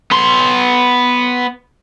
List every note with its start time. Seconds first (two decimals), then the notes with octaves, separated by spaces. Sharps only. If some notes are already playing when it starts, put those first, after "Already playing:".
0.11 B3 C6